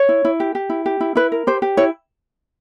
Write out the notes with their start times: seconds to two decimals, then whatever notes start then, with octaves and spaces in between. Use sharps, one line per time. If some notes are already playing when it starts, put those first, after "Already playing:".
Already playing: C#5
0.09 E4
0.25 E4
0.40 G4
0.55 G4
0.70 E4
0.86 G4
1.01 E4
1.15 E4 B4
1.32 A#4
1.47 G4 C5
1.62 G4
1.77 E4 C#5